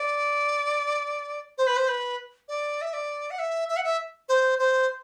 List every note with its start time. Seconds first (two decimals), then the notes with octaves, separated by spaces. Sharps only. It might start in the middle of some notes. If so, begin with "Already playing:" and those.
Already playing: D5
1.58 C5
1.67 B4
1.76 C5
1.88 B4
2.48 D5
2.81 E5
2.93 D5
3.30 F#5
3.39 E5
3.68 E5
3.76 F#5
3.84 E5
4.29 C5
4.59 C5